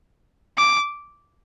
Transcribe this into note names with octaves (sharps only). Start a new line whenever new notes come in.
D6